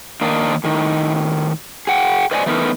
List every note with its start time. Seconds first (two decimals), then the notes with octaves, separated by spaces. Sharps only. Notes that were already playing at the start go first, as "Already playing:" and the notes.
0.21 D#3 A#3 D4 D#4
0.64 A2 D#3
1.87 G#4 F#5 G5
2.31 B4 C5 D5 D#5 F#5 G#5
2.46 E3 A3 B3 D#4 A#4